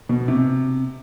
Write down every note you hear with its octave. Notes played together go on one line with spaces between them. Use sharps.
B2
C3